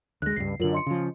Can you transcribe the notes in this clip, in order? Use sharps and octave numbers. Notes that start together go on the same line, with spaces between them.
D2 G#3 F#6 A#6
C#2 G2 C7
F#2 D3 F4 A#4 F#7
D#5 C6 C#7
C#3 F3